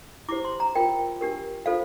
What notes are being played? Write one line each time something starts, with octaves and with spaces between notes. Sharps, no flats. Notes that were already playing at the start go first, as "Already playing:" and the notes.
E4 G4 C5 D6
C6
A#5
F4 A#4 G5
D4 G4 A#4
F4 A4 C5 F5